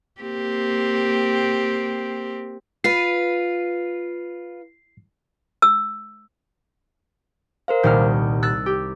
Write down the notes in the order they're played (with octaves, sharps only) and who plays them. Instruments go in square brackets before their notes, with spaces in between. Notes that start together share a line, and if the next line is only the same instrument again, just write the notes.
[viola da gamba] A#3 C4 G4
[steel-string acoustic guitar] F4 B4 [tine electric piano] C7
[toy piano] E6
[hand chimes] A#4 C5 F5
[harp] D#1 C2 F6 [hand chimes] G6
[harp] E6 F#6 A6
G4